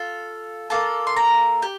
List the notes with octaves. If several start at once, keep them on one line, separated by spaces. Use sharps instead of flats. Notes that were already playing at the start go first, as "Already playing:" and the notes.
Already playing: F4 A4
A#3 F4 A4 A5
C6
A#5
G4